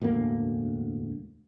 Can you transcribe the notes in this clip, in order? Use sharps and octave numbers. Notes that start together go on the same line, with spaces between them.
E1 D2 A2 A#3